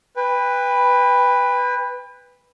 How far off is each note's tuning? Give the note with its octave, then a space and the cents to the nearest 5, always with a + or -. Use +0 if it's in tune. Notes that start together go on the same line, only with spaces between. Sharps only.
B4 +0 G5 +35